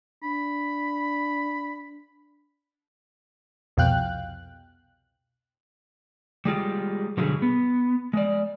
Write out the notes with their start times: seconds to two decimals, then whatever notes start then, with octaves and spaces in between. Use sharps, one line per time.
0.23 D4 B5
3.77 C2 F2 B2 F5 G5 F#6
6.45 G3 G#3 F4 G4
7.17 B2 D3 F#3 G3 C#4 G#4
7.42 B3
8.13 G#3 D5